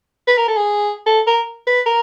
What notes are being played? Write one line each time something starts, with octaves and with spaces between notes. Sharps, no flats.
B4
A#4
A4
G#4
A4
A#4
B4
A#4